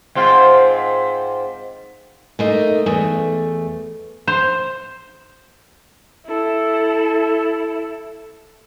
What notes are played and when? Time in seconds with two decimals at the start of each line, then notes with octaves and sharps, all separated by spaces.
0.15 G#2 C4 F4
2.39 A3 A#3 D#4
2.86 E2 A3
4.27 C5
6.25 E4 A4